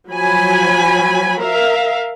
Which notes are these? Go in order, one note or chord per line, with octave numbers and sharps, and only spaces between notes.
F3 F#3 G#5 B5
A#4 E5 F5